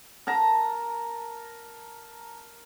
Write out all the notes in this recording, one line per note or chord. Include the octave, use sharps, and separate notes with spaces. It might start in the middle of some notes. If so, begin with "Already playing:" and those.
A#4 A5 A#5